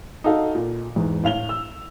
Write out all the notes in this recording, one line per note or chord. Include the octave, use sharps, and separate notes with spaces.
D#4 F#4 A4 F5
A#2
E2 G#2
A2 F5 F7 G7
E6